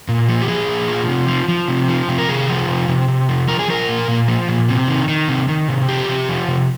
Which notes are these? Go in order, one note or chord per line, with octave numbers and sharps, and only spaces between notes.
A#2
F3
G4
F3 G#4
A#2
F3
C3
F3
F3
C3
F3
C3
A#4
C3 G#4
F3
C3
C3
C3
F3
F3 A#4
G#4
F3 A#4
A#2
A#2
F3
A#2
C3
D#3
D#3
C3
D#3
C3
F3 G4
C3
F3
C3